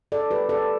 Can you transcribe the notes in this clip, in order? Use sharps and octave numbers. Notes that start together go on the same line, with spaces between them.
A4 D5
G4 B4
A4 D5